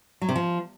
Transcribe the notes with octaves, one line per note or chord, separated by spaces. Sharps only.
F#3
C3
F3